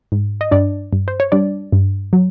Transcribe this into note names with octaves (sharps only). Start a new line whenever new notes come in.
G#2
D#5
G2 D4 D5
G2
C5
C#5
G3 D4 D5
G2
F#3